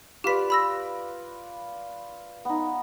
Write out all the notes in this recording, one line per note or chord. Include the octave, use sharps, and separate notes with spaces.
F4 G4 B4 D5 B6
B5 E6 A#6
B3 D#4